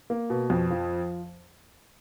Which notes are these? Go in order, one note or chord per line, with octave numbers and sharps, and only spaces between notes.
A#3
B2
F2
F3